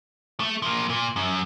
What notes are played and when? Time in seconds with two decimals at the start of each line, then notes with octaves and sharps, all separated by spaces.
0.40 A3
0.62 F3 A#3
0.89 A#2
1.16 F#2